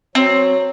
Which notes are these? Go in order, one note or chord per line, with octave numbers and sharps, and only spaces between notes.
F#3 C4